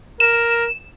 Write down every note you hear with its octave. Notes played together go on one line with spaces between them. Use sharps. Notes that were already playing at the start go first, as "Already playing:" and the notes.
A#4 E7